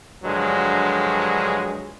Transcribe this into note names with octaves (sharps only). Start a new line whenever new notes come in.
G2 D3 F3 F#3 G#3